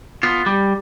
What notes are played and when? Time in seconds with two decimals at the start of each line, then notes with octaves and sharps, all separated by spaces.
0.23 B3 F4
0.46 G3